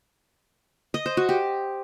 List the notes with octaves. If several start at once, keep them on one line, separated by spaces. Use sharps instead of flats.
D#5
C5
F#4
G4